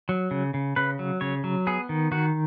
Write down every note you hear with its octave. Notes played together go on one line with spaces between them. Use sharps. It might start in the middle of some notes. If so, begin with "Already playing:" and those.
F#3
C#3
C#3
C#3 B4
F#3
C#3 C#5
F#3
B3 G#4
D#3
D#3 F#4